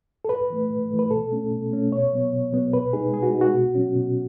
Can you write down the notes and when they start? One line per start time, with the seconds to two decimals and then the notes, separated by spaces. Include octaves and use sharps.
0.25 A4
0.29 A2 B4
0.50 E3 A3
0.70 A2
0.91 E3 A3
0.99 B4
1.11 B2 A4
1.32 A3 C#4
1.51 B2
1.71 A3 C#4
1.92 B2 C#5
2.12 F#3 B3
2.33 B2
2.53 F#3 B3
2.73 B2 B4
2.93 G#3 D#4 G#4
3.14 B2 G#4
3.23 F#4
3.34 G#3 D#4
3.41 F#4
3.55 B2
3.75 F#3 C#4
3.95 B2